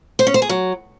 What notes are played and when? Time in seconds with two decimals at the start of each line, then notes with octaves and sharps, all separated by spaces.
0.19 C5
0.27 C#4
0.34 C5
0.42 G#4
0.49 F#3